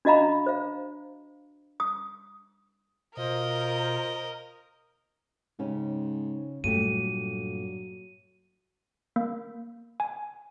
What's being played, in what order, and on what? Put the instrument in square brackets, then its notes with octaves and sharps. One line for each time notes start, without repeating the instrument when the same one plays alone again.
[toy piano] D4 F#4 D#5 F5 A#5 B5
C5 F5
D#6
[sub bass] B2 [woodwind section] F4 C5 [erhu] A#4 [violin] D#5
[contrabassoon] G#2 [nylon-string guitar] C#3 C#4 G4
[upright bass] G2 [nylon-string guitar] A#2 A3 G4 [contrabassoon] F#3 [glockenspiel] D#7
[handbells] A#3
G#5